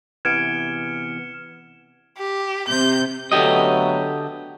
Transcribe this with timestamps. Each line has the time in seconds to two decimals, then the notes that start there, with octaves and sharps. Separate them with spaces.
0.25 C3 E3 B3 F6 G#6 C#7 D7 E7
2.18 G4
2.68 C3 G6
3.32 D3 F#3 A3 B3 G4 D#5